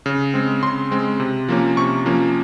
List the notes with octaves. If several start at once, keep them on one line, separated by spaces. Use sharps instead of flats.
C#3
G#3 C4
C#3 C6
G#3 C4
C3
F3 A#3 C#4
C3 C#6
F3 A#3 C#4